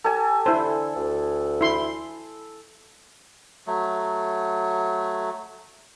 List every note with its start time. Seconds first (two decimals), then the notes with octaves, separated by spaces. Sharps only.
0.04 G4 A4 G#5
0.46 D3 E4 C5
0.96 D2
1.61 E4 C6
3.67 F#3 A3